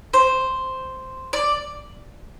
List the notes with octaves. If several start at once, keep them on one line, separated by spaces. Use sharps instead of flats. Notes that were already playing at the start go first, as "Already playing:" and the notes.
C5
D5